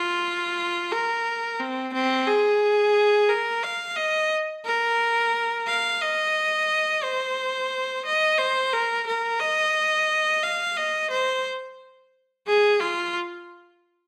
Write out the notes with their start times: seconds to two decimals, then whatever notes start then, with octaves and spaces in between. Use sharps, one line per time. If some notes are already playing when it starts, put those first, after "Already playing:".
Already playing: F4
0.92 A#4
1.60 C4
1.94 C4
2.27 G#4
3.30 A#4
3.63 F5
3.96 D#5
4.65 A#4
5.67 F5
6.01 D#5
7.03 C5
8.05 D#5
8.38 C5
8.72 A#4
9.07 A#4
9.40 D#5
10.43 F5
10.77 D#5
11.10 C5
12.47 G#4
12.80 F4